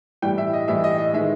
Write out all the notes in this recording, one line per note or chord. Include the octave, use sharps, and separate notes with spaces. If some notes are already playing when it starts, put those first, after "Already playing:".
A2 E3 G3 G5
E5
D#5
A2 E3 G3 E5
D#5
D#5
D#3 G#3 E5